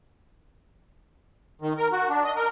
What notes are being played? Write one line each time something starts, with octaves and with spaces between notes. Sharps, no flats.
D#3
A#4
F#4
D4
D#5
A#4